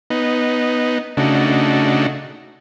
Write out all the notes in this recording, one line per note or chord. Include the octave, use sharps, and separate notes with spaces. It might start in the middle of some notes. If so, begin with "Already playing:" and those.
B3 D#4
C#3 A3 D4 D#4 F#4